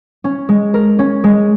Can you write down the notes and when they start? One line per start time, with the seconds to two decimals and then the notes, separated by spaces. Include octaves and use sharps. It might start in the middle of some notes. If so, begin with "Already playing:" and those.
0.24 C#4
0.49 G#3
0.74 A#4
0.99 C#4
1.24 G#3